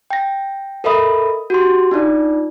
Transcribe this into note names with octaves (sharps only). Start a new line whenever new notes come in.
G5 A#6
A4 A#4 D#5 E5 B5 D#6
F#4 G4 C6
D4 D#4 F4 D5